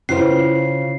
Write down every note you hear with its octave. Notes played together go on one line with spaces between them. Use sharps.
C#3 C#4 E4 F4 B4 C5 C7